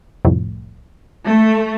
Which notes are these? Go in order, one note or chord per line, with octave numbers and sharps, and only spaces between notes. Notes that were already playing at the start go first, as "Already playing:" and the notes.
C2 F2 A2
A3